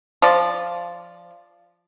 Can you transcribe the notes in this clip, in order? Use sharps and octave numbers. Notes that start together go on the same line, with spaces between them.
F3 D5